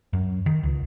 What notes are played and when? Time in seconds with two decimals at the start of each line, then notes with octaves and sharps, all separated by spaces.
0.13 F#2
0.46 D#3
0.63 C#2